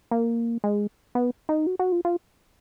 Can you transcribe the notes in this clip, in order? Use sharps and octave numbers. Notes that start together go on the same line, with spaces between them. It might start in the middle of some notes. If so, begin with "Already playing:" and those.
A#3
G#3
B3
D#4
F#4
F#4
F4
F4